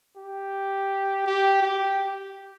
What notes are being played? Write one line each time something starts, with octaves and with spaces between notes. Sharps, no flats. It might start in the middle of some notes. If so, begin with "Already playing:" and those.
G4
G4
G4